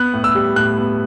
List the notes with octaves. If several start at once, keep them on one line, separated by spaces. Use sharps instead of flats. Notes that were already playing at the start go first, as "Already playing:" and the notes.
Already playing: B3 F#6
A2
E6
G3
A2 F#6
B3